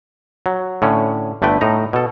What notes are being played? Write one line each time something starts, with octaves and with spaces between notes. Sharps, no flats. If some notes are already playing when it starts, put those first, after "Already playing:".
F#3
A2 D3 C#4
G1 D3 A3 B4 G5
A2 D#4 A#5
B2 A4